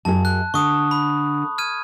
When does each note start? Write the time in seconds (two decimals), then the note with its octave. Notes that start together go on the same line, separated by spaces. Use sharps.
0.05 F#2 G#4 A5
0.25 F#6
0.54 D3 C#6 D#6
0.91 B5
1.58 F6 G#6 D#7